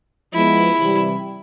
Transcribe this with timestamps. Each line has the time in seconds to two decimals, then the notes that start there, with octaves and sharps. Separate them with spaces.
0.33 F3 G#3 B3 E4
0.79 C3 E3 G3